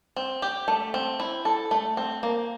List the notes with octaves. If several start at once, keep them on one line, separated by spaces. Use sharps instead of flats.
C4
G4
A3
C4
E4
A4
A3
C4
A#3